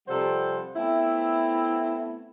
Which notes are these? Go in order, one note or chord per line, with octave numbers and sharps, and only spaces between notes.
C3 F3 G3 A4 C5 F#5
A3 B3 C4 E4